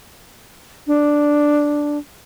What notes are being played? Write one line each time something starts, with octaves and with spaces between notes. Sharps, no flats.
D4